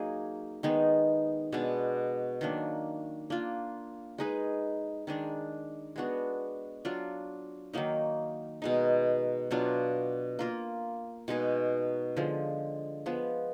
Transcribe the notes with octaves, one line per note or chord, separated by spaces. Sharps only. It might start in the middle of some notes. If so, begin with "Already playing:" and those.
Already playing: F#3 A#3 D#4 G#4
D#3 G#3 B3 D#4
B2 G#3 B3 D4
D#3 F#3 A#3 D4
A#3 D4 F4
G#3 D#4 G#4 B4
D#3 G#3 D4
G#3 B3 D4 F#4
F#3 D4 F4
D#3 F#3 A#3 D#4
B2 G#3 D#4
B2 F#3 D4 F4
A#3 F4 A#4
B2 G#3 D#4 G#4
D3 F3 G#3
F3 G#3 B3